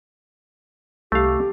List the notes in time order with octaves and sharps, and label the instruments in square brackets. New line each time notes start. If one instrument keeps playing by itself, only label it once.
[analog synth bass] C2 [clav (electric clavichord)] A3 F5 [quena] G4